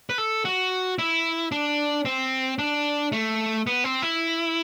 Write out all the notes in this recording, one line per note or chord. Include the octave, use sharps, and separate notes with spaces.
B4
A4
F#4
E4
D4
C4
D4
A3
B3
C4
E4